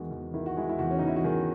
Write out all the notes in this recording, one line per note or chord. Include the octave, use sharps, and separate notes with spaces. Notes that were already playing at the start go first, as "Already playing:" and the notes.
Already playing: E2 D#3 G#3 F#4
E2
D#3 E4
F#4
G#3 E4
E4
E2 F#4
C#4
E2 D#4
E4
F#4
D#3 G#4